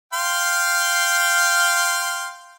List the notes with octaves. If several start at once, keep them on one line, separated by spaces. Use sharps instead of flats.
F5 G5 C6